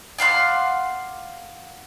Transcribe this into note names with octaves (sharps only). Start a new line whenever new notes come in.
D5 F5 F#5 C6